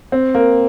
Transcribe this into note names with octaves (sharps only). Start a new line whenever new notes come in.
C4
A#3